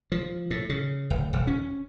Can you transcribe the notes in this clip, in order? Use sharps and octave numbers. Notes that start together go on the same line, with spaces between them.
F3
A2
C#3
D1
D#1
C#4